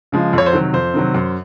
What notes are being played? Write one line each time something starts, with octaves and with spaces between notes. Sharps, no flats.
C#3 F3 G#3
F2 C#5
C5
C3 D#3 F#3
F2 C5
C3 D#3 F#3
F#2